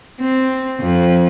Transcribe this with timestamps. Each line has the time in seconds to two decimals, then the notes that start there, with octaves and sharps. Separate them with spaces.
0.20 C4
0.81 F2